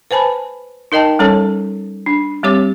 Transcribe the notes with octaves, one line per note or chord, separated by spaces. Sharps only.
B4 C5 G#5 A5 B5
D#4 A#4 D#5 G5 A5
G3 C#4 A4 C#5 A5
D4
G3 C4 G4 C#5 D6